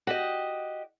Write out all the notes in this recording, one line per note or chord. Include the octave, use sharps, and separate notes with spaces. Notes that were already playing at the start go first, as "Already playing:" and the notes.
F#4 G4 D#5